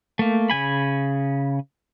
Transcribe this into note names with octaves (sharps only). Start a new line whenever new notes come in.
A3 A#3
C#3 A3 G#5 B5